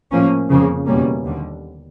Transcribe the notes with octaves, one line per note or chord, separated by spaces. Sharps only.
A2 F3 A#3 C#4
F2 C#3 F3 A#3
E2 B2 G3 A#3 C#4
D#2 D3 G3